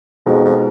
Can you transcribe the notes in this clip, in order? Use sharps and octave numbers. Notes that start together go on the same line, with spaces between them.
F2 B2 G#3 D#4 F#4
F2